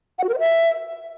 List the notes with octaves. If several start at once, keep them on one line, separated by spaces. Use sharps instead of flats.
F#5
F#4
A#4
C5
E5